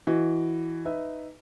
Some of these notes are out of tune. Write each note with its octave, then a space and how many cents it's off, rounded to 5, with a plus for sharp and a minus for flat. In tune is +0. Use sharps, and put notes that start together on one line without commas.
E3 +0 F#4 +10 D#5 +0
D#4 +0 B4 +10 E5 +0